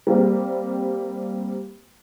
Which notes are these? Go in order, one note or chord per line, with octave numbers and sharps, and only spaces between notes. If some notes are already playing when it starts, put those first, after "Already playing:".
G3 A#3 C4